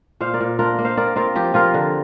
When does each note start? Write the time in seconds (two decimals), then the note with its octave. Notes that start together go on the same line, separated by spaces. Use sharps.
0.20 A#2 C5 F5
0.34 A#4 D5
0.41 A#2
0.59 D4 F4 A#4
0.78 A#3
0.85 C5 F5
0.97 C4 A#4 D5
1.16 C4 F4 A#4
1.35 F3 G4
1.54 F3 F4 A#4
1.74 D3